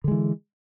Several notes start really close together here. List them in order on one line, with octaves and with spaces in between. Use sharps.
D3 G#3 E3